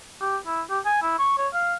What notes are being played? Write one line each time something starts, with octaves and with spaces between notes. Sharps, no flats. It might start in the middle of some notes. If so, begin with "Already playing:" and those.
G4
E4
G4
G#5
E4
C#6
C#5
F5